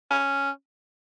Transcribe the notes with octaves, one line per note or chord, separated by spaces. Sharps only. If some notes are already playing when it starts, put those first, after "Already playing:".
C#4